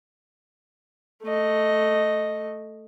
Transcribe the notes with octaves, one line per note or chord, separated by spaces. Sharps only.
A3 D#5